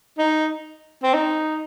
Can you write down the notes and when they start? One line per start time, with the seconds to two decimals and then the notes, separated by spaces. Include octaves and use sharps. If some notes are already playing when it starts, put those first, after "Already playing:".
0.18 D#4
1.03 C4
1.14 D#4